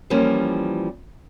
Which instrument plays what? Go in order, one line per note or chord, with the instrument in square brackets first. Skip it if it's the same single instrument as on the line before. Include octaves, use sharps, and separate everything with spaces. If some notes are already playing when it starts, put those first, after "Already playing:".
[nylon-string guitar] E3 F3 G3 A#3 C#4